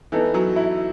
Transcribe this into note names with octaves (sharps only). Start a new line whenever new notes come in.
E3 B3 D#4 A4
F#3
E4